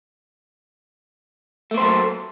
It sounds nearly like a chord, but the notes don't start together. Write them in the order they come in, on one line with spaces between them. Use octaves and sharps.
A3 A#3 C5 F#3 A4